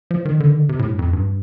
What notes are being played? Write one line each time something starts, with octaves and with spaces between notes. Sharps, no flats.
F3
D#3
D3
D#3
D3
C3
A2
G2
F2
G2